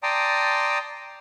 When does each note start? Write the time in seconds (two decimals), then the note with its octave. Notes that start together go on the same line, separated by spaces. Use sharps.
0.03 D5 G5 A5 A#5 C6 D#6